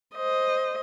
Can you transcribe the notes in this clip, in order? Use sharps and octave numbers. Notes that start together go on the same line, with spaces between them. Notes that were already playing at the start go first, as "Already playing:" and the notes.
C5 D#5